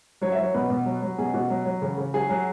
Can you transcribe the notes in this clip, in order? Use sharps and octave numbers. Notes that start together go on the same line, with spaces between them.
F#3 C#5
E5
F#3
C#5
B2 B4
B2
F#3
F#3
B2 G#4
B2 F#4
F#3
F#3
C#3
C#3
F#3 G#4
F#3 G#4